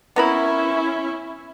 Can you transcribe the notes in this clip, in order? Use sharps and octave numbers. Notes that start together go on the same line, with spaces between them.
B3 C#4 E4 A#4 B5